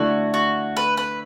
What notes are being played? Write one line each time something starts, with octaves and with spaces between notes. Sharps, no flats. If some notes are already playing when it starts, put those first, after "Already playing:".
Already playing: D3 A3 E4 F#4 D5
F#4
B4
B4